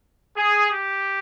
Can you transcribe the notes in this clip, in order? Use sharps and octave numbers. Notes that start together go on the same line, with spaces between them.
G#4
G4